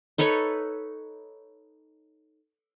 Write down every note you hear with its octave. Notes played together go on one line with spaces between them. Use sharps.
D#4 A4 B4 C#5